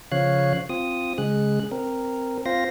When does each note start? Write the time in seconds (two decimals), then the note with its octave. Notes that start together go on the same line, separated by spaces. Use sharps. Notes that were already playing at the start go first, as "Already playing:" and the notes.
0.12 C#3 F3 C#5 F5 F#6
0.69 C4 F4 D#6
1.18 C#3 G#3 G#4 F#6
1.71 C4 A#4
2.46 C4 F4 C5 F5 A#6